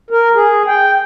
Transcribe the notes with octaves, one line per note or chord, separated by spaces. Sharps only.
A#4
G#4
G5